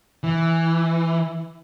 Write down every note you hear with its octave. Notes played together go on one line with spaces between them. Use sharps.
E3